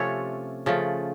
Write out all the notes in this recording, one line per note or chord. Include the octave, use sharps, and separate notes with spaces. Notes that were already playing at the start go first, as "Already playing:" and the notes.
Already playing: C3 F3 A3 C#4 C#5
C#3 F3 A3